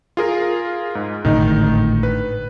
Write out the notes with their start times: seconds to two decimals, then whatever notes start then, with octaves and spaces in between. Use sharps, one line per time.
0.17 F4 G#4 A#4
0.95 G#2
1.25 G#1 A2 D3 D#3 D#4
2.03 B4